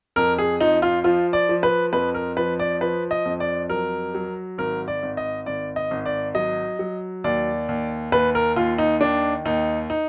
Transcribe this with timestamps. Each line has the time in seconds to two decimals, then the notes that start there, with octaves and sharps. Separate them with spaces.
0.16 F2 A#4
0.38 G#4
0.60 F3 D#4
0.82 F4
1.04 F3 F4
1.33 D5
1.49 F3
1.63 B4
1.93 F2 B4
2.14 A#4
2.37 F3 B4
2.60 D5
2.81 F3 B4
3.11 D#5
3.25 F2
3.40 D5
3.70 F#3 A#4
4.14 F#3
4.58 G#1 A#4
4.88 D5
5.03 G#1
5.17 D#5
5.46 G#1 D5
5.76 D#5
5.91 G#1
6.06 D5
6.35 F#3 D#5
6.79 F#3
7.24 D#2 D5
7.69 D#2
8.12 D#2 B4
8.35 A#4
8.56 D#2 F4
8.78 D#4
9.01 D#3 D4
9.45 D#2 D#4
9.90 D#4